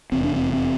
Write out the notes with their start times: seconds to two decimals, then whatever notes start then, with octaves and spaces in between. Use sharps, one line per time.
0.12 F1 E2 C3 C4
0.24 D4
0.36 C4
0.53 C4